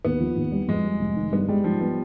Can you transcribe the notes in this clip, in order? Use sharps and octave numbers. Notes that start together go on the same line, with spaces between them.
D#2 B3
F3
D#2
G3
F2 G#3
G3
F1
D#3
G2 B3
G3 G#3
G#2 F3
F3 B3